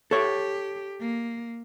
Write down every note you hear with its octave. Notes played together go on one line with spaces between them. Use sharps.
G4 A4 C#5
A#3